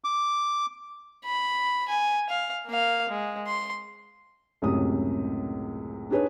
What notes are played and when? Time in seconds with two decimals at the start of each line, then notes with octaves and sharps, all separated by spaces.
0.04 D6
1.25 B5
1.89 G#5
2.29 F5
2.66 A#3 F5
3.09 G#3
3.47 C6
4.62 C#2 F#2 A2 C3 D#6
6.11 D4 D#4 G#4 B4 C#5